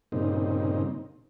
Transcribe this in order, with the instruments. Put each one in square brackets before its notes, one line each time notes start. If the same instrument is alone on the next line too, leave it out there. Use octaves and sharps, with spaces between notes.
[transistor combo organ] G2 A#2 C#3 C4 D#4